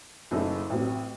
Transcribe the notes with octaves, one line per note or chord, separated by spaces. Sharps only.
F#1 F#2 C#3 A3 D#4
A1 A2 F#3 C4